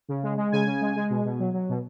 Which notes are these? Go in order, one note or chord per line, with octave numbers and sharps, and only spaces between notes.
C#3
G#3
G#3
C#3 G#5
C#3
G#3
G#3
B2
B2
F#3
F#3
B2